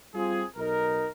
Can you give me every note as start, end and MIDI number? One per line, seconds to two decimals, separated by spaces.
0.15 0.44 55
0.15 0.44 60
0.15 0.44 65
0.15 0.44 68
0.57 1.08 35
0.57 1.08 63
0.57 1.08 70